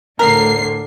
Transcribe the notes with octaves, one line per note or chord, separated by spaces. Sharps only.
D2 A2 D3 A#4 C7